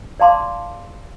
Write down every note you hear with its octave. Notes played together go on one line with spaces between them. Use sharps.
D5 F5 A5 C6 D6